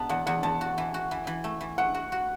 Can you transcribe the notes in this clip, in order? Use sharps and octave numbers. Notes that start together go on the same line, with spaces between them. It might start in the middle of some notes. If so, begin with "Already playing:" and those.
Already playing: B2 B3 A5
E2 F#5
E2 F#5
E2 A5
F#4
E3
F#4
E3
E3
A3
E3
A3 F#5
F#4
F#4